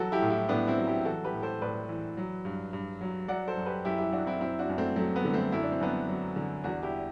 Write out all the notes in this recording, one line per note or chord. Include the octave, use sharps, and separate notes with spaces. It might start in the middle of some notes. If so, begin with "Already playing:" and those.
Already playing: E3 F#3 F#4 A4
E4 G4
A2
E4 G4
A2 B3 D4
C4 E4
F#3
E4 G4
E3 F#4 A4
G4 B4
A2
A4 C5
A2 B4 D5
E3
F#3
G2
G2
F#3
F#3 D5 F#5
A4 C5
F#2
G4 B4
F#2 E4 G4
E4 G4
F#3 D4 F#4
C4 E4
F#2 C4 E4
D4 F#4
F#2
A3 C4
F#3 A3
B3
D3
A3 C4
F#2 E4
D4
C4
F#2 B3 D4
F#3
D3
E2 D4 F#4
E4 G4